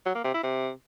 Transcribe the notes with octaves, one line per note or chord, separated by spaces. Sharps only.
F#3
A#3
C3
E4
C3